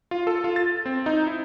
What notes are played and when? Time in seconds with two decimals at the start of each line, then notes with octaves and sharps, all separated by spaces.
0.11 F4
0.27 A4
0.44 F4
0.56 A6
0.86 C4
1.06 D#4
1.27 E4